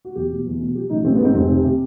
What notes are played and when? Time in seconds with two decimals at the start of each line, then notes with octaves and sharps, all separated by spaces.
0.05 F#4
0.15 E2 G4
0.31 B2
0.46 E2
0.60 B2
0.75 F3 G4
0.90 A1 D#4
1.04 A1 C4
1.15 B3
1.20 G#2 C4
1.35 F1 C4
1.50 C3
1.64 C3